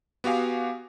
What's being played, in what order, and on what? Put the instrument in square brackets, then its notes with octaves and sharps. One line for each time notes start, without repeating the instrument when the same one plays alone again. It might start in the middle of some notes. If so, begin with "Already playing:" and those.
[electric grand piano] B3 F#4 G4 F5 G#5